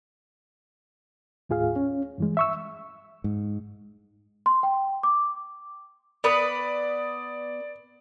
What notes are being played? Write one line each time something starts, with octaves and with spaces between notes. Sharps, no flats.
D#2 A2 F4 G#4 F5
C#4
G2 E3 G#3
E5 C#6 E6
G#2
C6
G5
D6
B3 B4 D5 D#6